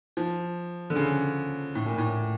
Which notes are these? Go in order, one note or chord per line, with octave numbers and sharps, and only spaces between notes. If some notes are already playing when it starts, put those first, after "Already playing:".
F3
D3
C#3
A2
A#2
A2